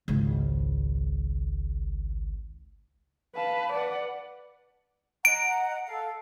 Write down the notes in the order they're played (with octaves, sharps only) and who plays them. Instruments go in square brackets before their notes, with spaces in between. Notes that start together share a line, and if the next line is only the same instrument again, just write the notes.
[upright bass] G#1 C#2
[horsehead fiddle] B4 [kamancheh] F5 A5
[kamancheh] B4 [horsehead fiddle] D5 F#5
[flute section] D#5 F#5 A#5 [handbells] D7
[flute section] A4 F5